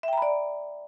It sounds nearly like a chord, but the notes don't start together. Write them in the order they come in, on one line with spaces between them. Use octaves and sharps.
E5 G5 A#5 B5 D5